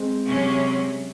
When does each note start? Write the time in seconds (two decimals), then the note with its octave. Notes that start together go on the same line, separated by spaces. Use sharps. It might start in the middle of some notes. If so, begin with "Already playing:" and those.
Already playing: G#3 C4
0.27 C3 F#3 C#4